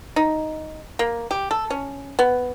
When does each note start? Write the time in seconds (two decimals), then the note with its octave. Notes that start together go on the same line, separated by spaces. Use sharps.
0.16 D#4
0.99 A#3
1.31 G4
1.51 A4
1.70 C#4
2.19 B3